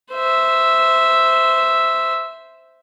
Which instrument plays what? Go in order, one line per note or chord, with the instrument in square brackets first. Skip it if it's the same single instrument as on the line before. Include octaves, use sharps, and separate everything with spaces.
[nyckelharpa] C5 E5